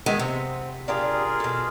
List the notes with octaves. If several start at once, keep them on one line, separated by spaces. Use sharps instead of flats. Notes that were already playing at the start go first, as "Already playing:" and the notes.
D#3 G#3 B3 E5 G5
C3 C4
D4 F4 G4 G#4 A#4 F5
B2 A4